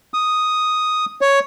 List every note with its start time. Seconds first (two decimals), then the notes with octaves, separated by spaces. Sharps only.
0.14 D#6
1.21 C#5